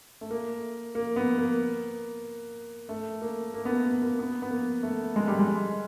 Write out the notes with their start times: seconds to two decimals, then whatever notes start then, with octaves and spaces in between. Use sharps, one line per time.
0.21 A3
0.31 A#3
0.95 A#3
1.16 B3
1.38 A#3
2.89 A3
3.22 A#3
3.54 A#3
3.65 B3
3.69 A#3
3.87 B3
4.02 A#3
4.19 B3
4.42 B3
4.51 A#3
4.83 A3
5.16 G#3
5.27 G3
5.39 G#3